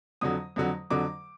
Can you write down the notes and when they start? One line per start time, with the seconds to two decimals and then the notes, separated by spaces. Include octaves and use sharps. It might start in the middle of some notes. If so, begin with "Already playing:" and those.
0.21 F2 D3 F#3 D#6
0.56 F2 D3 F#3
0.90 F2 D3 F#3 D6